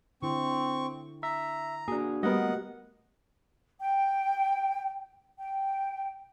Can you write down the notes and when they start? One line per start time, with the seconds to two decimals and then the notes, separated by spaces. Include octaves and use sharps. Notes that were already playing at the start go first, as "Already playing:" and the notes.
0.22 D3 C4 E4 C#6
1.23 E5 A#5
1.88 A#3 D4 F#4 G#4
2.23 G3 A3 B3 G4 A#4 D#5 F#5
3.80 G5
5.38 G5